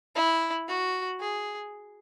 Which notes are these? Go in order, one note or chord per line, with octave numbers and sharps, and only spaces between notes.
E4
F#4
G#4